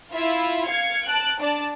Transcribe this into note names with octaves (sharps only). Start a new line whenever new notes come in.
E4 F4 E5
F5 G#6 C#7
A5 F#6 D7
D4 D5 A5